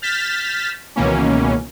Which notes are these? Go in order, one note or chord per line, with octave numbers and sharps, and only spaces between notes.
F6 G6 A6 B6 E7
C#2 B2 D#3 E3 A#3 C#4